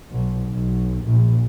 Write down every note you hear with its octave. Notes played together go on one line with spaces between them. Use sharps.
B1
B1
A#1